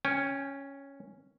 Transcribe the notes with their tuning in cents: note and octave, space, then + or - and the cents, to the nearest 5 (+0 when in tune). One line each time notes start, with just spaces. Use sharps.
C#4 +0 G5 +40